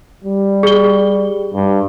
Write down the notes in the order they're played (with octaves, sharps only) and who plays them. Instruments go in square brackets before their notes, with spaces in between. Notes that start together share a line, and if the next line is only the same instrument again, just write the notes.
[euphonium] G3
[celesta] G#4 G7
[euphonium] G2